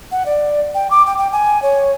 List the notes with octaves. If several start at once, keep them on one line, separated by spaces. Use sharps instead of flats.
F#5
D5
G5
D6
G5
G5
G#5
C#5